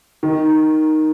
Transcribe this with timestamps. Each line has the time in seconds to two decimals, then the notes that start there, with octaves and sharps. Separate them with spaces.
0.23 D#3